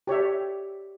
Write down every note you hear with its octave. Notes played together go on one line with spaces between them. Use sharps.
G4 C#5 D5 E5